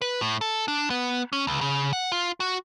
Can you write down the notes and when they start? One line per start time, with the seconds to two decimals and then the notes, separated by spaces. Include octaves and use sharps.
0.02 B4
0.21 A2
0.41 A4
0.68 D4
0.90 B3
1.33 C#4
1.47 C#2
1.61 C#3
1.93 F#5
2.12 F4
2.40 F#4